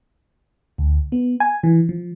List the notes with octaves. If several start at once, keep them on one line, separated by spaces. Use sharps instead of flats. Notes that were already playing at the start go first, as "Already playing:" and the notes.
D2
B3
G#5
E3
F3